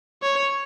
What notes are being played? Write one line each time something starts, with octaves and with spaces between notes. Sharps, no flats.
C#5